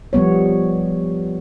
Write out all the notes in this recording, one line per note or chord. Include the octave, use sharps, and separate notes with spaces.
F3 G3 B3 C#5